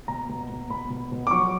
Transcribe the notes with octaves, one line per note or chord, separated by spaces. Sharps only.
B2 A#5
B2
B2
B2 B5
B2
B2
D6
F#3 C#6